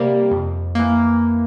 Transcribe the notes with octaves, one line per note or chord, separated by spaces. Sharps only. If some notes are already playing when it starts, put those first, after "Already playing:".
Already playing: C3 G3 A#3
F2
E3 A#3